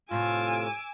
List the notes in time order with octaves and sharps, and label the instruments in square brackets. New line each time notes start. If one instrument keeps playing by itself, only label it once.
[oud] A2 C3 [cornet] F4 [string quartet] G#5 D6 E6